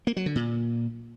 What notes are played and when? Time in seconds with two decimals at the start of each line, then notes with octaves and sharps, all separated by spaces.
0.07 A#3
0.17 F#3
0.26 D3
0.36 A#2